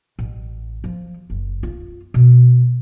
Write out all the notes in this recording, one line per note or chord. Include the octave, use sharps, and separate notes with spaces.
A1
F3
F#1
F4
B2